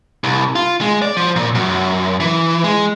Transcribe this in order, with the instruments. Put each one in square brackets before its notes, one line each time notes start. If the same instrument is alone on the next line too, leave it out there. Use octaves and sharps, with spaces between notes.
[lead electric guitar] C2
F4
G#3
D5
F3
A#2
F#2
E3
G#3